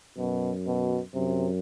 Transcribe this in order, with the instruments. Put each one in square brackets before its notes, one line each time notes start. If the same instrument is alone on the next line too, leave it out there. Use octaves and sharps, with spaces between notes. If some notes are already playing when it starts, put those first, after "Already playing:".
[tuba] F#2 [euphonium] B2
[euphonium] B2
[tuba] F#2 [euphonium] C3